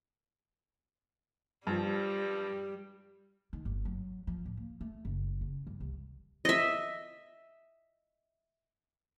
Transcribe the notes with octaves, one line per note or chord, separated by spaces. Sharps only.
G2 F3 G3
D#3
G1
F#3
F3
A2
A#3
A3
F#1
C#3
G2
C2
D#5 E5